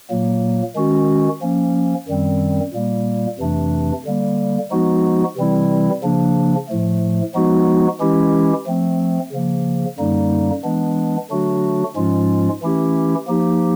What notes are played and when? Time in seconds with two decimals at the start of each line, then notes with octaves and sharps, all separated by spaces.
0.10 A#2 F#3 A#3
0.76 D#3 G#3 C#4 F#4
1.41 F3 A#3 C#4
2.08 F#2 D#3 G3 C4
2.73 A#2 G3 A#3
3.39 F2 C3 E3 A3 D4
4.05 D3 G3 A#3
4.71 F3 G#3 B3 D#4 F#4
5.36 C3 E3 G3 C4 E4
6.03 C#3 F3 A#3 D4
6.68 A2 F3 A3
7.34 F3 G#3 B3 D#4 F#4
8.00 E3 G#3 C#4 E4 G4
8.66 F3 A3 C4
9.32 C#3 F3 A#3
9.99 F#2 D3 G3 A#3 D#4
10.64 E3 G#3 B3 D4
11.30 D3 F#3 A3 D4 F#4
11.96 G#2 F3 G#3 C#4 F4
12.62 E3 A3 C#4 E4 G4
13.28 F3 A#3 D#4 G4